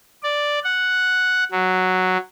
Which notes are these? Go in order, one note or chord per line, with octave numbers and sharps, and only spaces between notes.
D5
F#5
F#3